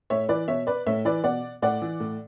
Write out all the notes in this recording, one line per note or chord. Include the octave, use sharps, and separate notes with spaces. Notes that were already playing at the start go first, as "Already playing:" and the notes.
A2 C#5 E5
E3 B4 D5
B2 C#5 E5
B4 D5
A2 C#5 E5
E3 B4 D5
B2 D5 F#5
A2 D5 F#5
E3
A2